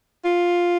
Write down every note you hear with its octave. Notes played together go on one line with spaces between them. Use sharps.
F4